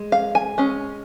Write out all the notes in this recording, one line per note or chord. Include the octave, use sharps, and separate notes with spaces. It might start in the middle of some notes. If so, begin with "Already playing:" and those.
Already playing: G#3
F5
G#5
G#3 C#4